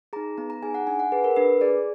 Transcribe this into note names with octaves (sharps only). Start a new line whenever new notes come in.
D#4 G#4 A#5
B3 A#5
A#5
D#4 G#4 G#5
F#5
D4 G#5
F#5
G#4 B4
A#4
D4 B4
G#4 D5